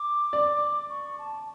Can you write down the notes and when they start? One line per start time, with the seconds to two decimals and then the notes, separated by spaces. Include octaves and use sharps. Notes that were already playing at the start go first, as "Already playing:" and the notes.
Already playing: D6
0.33 D5
0.90 C#6
1.19 A5